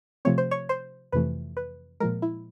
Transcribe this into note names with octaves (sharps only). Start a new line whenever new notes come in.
C3 F3 A3 C4 C#5
C5
C#5
C5
F2 C3 E3 A3 B4
B4
A#2 F3 G#3 A#4
E4